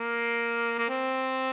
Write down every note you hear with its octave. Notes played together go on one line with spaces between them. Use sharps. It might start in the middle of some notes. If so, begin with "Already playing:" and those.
Already playing: A#3
A#3
C4